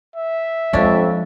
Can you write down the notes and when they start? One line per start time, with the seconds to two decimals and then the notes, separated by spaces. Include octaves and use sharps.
0.16 E5
0.73 F2 F3 G#3 C#4 D4